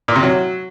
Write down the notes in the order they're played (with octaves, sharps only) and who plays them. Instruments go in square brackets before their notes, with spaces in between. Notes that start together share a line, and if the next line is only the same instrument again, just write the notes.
[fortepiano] A#2
C3
F#3